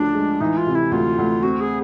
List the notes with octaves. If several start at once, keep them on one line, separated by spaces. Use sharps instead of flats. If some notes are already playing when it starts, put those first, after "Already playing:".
Already playing: D2 C#3 F3 D4
G#3
E3 D#4
F4
C3
E4
D2 F4
D2
C4 F#4
G#4